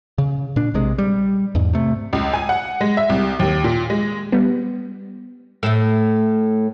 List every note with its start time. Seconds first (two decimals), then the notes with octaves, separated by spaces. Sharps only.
0.18 C#3
0.56 A#2 D4
0.74 A#1 C3 G#3
0.98 G3
1.55 E2 G#2
1.73 C3 A3
2.13 C#2
2.33 G#5
2.49 F#5
2.81 G#3
2.97 E5
3.09 C2
3.39 D#2
3.64 A#2
3.90 G#3
4.32 G3 B3
5.63 A2 A3 E6